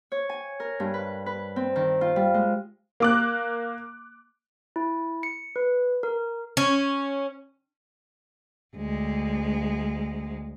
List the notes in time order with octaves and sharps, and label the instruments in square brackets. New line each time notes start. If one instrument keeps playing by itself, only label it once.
[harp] C#5
G#5
A#4
G2
B4
B4
C4
D#3
F4
G3
G#3
[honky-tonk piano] A#3 D6 F#6
[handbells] E4
C#7
B4
A#4
[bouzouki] C#4
[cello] D2 G#3